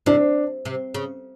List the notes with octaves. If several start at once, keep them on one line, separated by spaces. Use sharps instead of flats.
C3 D4
C3
C#3